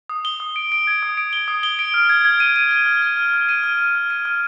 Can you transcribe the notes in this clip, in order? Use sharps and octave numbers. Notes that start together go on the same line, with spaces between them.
D#6
G7
D#6
D7
D7
G#6
D#6
D7
G7
D#6
G7
D7
F6
G#6
G#6
D#7
D#7
D#7
F6
D#7
F6
F6
D#7
F6
F6
F6
D#7
F6